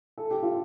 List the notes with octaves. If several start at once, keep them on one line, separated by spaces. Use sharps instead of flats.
A4
G4
F4